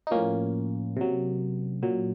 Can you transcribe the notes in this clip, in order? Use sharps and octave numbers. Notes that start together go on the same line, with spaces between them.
D#4
A2 F3 A#3 C#4
C3 F#3
A#2 F#3